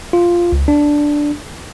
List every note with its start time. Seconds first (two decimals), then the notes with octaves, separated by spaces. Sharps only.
0.13 F4
0.52 C#2
0.68 D4